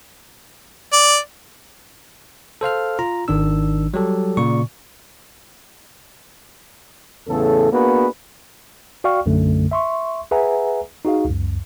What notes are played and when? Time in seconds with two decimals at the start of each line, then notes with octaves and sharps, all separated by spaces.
0.93 D5
2.61 A4 C5 F5 F6
2.99 F4 A#5
3.28 G#1 D#3 D4 E6
3.94 F#3 G3 G4 A4
4.37 A#2 C#3 D5 C#6
7.28 E2 A2 C#3 A4
7.72 A#3 B3 D4 F#4 G#4 B4
9.04 F#4 D5 F5 G5 C#6 F6
9.26 B1 F#2 D3 A3
9.71 E5 C6 C#6
10.31 G#4 B4 E5 F#5 G#5 A#5
11.05 D#4 F#4 G#4 F5
11.25 C#2 F#2